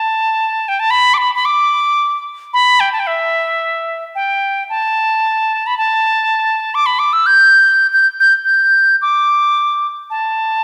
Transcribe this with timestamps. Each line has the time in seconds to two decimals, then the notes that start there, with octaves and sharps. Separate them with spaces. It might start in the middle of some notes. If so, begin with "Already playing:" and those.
Already playing: A5
0.68 G5
0.80 A5
0.91 B5
1.14 D6
1.18 B5
1.35 B5
1.45 D6
2.53 B5
2.80 G5
2.92 A5
3.00 G5
3.07 E5
4.15 G5
4.70 A5
5.67 B5
5.78 A5
6.75 D6
6.86 B5
6.99 D6
7.13 E6
7.26 G6
7.93 G6
8.20 G6
8.45 G6
9.02 D6
10.10 A5